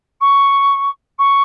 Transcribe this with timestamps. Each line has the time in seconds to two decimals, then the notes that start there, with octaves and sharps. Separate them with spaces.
0.20 C#6
1.18 C#6